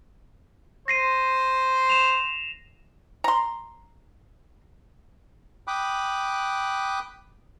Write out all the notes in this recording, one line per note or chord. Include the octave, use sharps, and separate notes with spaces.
C5 A#6 C7 D#7
E7 F7
A#5 C6
G5 B5 D6 D#6 F#6